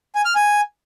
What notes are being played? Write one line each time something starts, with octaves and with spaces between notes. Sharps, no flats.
G#5
F6
G#5